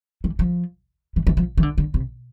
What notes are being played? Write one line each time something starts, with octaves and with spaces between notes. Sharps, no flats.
E3
F3
E3
E3
F3
E3
D3
D3
C3